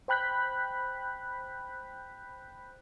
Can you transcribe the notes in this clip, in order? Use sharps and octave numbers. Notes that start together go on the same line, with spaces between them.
C5 G5 B5 F#6 G6 B6